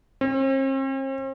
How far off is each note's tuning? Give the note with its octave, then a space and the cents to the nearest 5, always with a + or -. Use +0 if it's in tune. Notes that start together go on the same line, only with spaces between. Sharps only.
C4 +45